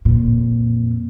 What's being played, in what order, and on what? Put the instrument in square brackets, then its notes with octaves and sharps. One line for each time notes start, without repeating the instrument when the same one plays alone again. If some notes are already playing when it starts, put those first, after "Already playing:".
[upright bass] F2 A#2